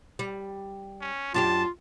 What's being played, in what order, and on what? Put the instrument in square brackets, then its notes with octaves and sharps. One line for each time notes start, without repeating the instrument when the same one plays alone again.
[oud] G3
[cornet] C#4
[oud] F#2 D4 G4 [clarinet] F4 [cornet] A5